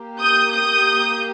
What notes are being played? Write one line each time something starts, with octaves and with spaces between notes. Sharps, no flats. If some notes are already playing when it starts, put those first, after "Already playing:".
Already playing: A#3 G4
D#6 G6
D#6 G6